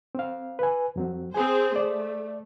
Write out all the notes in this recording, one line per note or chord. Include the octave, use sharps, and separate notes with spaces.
C4 F5
B4 G#5
F2 F#3 C4
C4 G#4 C5 G#5
A3 D5